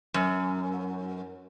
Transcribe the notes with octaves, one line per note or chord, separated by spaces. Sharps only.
F#2